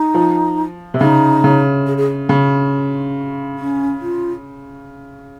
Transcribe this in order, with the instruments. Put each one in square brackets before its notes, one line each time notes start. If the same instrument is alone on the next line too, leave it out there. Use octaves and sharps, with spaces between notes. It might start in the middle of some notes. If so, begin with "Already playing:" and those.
Already playing: [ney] D#4
[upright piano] F3
C3
[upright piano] C#3 [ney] D#4
[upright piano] C#3
[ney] G#4
G#4
[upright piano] C#3
[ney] C#4
F4